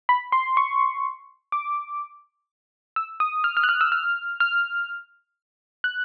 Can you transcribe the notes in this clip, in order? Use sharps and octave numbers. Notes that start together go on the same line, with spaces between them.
B5
C6
C#6
D6
E6
D#6
F6
F6
F#6
F6
E6
F6
F6
F#6